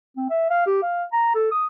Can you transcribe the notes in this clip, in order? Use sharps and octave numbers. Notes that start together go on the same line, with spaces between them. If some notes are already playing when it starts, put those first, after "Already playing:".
C4
E5
F5
G4
F5
A#5
A4
D#6